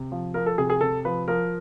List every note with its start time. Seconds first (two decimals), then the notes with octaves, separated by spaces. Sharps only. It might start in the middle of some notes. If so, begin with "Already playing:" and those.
Already playing: C3
0.12 F3
0.34 F3 A#4
0.46 A4
0.58 C3 G#4
0.70 G#4
0.81 C3 A4
1.05 F3 B4
1.28 F3 A#4